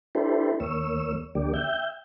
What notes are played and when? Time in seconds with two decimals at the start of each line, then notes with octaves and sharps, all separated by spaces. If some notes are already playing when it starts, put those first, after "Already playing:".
0.15 D4 E4 G4 A4 B4 C5
0.60 D#2 A#3 C#5 E6
1.35 D2 D3 A#3 G4 D5
1.54 E5 G5 G6